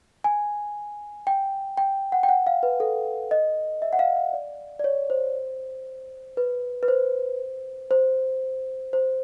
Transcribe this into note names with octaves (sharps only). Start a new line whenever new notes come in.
G#5
G5
G5
F#5
G5
F#5
F5
B4
A4
D#5
E5
F#5
F5
F5
D5
D5
C#5
C5
B4
B4
C5
C5
C5